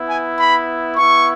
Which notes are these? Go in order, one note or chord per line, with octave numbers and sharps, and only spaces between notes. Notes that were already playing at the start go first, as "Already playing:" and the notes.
Already playing: B3 E4
G#5
B5
B3 E4 C#6